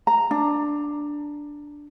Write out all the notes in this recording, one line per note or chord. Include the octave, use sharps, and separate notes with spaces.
A#5
D4